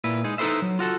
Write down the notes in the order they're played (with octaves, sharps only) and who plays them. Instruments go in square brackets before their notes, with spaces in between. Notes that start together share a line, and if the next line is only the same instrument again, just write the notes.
[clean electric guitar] A#2 E4 B4
G#3 D#4 G#4
D#4 E4 A4 B4 C5 E5
F#3
F4 F#4 A4